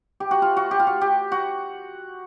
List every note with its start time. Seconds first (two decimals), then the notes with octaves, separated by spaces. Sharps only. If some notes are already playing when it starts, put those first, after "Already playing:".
0.20 G4
0.31 F#4
0.42 F4
0.57 F#4
0.71 G4
0.80 F4
0.87 F#4
1.01 G4
1.32 F#4